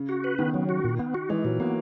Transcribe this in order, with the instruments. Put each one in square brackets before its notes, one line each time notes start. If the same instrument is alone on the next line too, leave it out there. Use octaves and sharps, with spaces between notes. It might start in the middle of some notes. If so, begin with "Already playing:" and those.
Already playing: [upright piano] C#3
[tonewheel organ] F#4
B4
[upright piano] D#3 [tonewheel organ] B3
[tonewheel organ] F#3
F#4
A#2
B3
F#4
[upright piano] E3 [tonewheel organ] G#3
[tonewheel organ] A#2 [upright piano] F#3
[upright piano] A#3 [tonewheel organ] B3